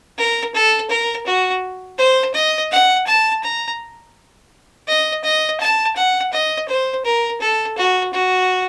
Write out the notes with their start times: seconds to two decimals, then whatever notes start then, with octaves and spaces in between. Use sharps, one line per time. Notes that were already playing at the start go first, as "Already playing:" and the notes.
0.18 A#4
0.54 A4
0.90 A#4
1.26 F#4
1.98 C5
2.34 D#5
2.71 F#5
3.07 A5
3.43 A#5
4.87 D#5
5.24 D#5
5.60 A5
5.96 F#5
6.32 D#5
6.68 C5
7.04 A#4
7.40 A4
7.77 F#4
8.13 F#4